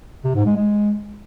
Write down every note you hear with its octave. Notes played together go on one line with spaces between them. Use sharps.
C3
G#2
G#3
G#3